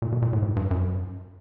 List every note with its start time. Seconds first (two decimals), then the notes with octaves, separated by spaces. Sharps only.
0.02 A#2
0.12 B2
0.22 A#2
0.33 A2
0.42 G#2
0.56 G2
0.71 F#2